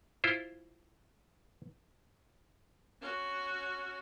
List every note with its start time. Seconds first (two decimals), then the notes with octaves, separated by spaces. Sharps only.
0.24 E4 F4 C5
3.02 C#4 F#4